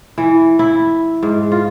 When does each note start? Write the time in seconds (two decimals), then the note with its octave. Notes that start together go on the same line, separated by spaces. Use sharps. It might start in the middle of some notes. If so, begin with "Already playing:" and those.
0.18 E3
0.59 E4
1.23 G#2
1.52 F4